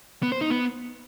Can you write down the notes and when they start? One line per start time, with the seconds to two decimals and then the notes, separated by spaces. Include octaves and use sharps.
0.23 B3
0.32 C5
0.41 D#4
0.50 B3